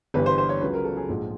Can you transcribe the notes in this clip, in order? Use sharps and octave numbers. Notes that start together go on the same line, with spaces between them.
G1 G2 E3 G3 B4
C5
C5
C#5
C#2 C#3 F#3 B4
A#4
A4
G#4
A#1 G#2 F3 G#3